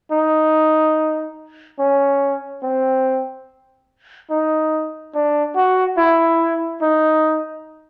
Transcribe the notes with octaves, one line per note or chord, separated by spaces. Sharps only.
D#4
C#4
C4
D#4
D4
F#4
E4
D#4